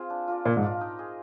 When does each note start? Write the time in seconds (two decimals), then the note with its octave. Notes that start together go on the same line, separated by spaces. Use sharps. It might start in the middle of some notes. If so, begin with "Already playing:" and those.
Already playing: C4 F4 G#4
0.10 D4
0.28 F4 A#4 D5
0.45 A#2 D4
0.57 G#2
0.63 F4 A#4 D5
0.81 D#4
0.99 G#4 D#5